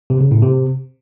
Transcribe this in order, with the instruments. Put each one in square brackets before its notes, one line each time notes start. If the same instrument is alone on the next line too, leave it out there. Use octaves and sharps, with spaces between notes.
[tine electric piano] C3
C#3
A2
C3